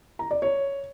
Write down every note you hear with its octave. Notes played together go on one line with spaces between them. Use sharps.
A#5
D5
C#5